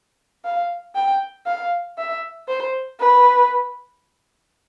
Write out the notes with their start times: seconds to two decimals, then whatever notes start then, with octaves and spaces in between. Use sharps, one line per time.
0.45 F5
0.95 G5
1.46 F5
1.98 E5
2.48 C5
3.00 B4